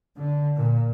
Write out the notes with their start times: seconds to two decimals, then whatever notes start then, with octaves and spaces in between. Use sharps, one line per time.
0.15 D3
0.57 A#2